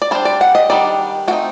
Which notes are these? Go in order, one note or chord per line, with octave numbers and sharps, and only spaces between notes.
D5
G3 D4 C5
D5
F#5
D#5
D#3 G3 D4 D5
A3 C4 D#4 F#4